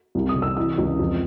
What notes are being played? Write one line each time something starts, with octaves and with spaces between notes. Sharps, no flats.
C2
D#6
C3
E6
E3 E6
C#2
F2